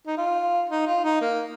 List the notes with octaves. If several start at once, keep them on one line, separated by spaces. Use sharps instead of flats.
D#4
F4
D#4
F4
D#4
A#3